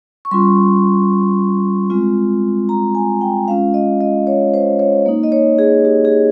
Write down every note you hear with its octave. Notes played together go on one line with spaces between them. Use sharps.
C#6
G3 C#4 F4 C6
G#3 C4 F4
A#5
G#5
G5
G#3 C#4 F4 F5
D#5
D#5
C#5
C5
C#5
A#3 D#4
D#5
C#5
G#4
G4
G#4